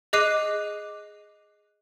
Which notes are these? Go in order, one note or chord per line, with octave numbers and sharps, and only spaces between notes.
G#4 D#5 D6 F#6 C7 D#7